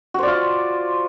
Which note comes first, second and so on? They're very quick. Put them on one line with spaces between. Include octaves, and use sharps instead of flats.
F#4 C5 D5 F4